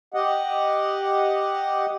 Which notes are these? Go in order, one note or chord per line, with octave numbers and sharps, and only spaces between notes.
G4 D#5 F#5